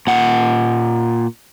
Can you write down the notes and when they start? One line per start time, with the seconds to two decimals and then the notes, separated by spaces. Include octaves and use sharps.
0.07 A#2 F#5